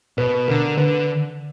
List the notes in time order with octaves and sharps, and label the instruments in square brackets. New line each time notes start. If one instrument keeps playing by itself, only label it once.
[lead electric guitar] B2 [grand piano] B4
[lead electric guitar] D3 [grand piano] A#4
[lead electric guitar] D3 [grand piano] B4